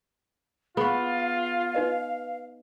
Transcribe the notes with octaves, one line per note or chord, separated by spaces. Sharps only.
B3 F4 G#4 F5 C#6
D#4 B4 D#5